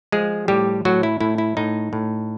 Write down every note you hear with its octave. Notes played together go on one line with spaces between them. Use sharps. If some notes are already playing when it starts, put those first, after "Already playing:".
F3 G#3 G#4
A2 G3 G4
A2 F#3 F#4
E4
A2 E4
E4
A2 D#4
A2